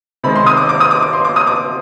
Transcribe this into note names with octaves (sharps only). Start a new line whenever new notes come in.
C3 D#3 G#3 B5
C6
D#6
D6
D6
D#6
D6
D6
C6
D6
D#6
D6